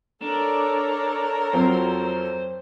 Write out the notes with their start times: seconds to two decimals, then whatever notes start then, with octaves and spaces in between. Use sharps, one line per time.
0.22 D4 A4 A#4 C#5
1.53 F2 F#3 C4 C5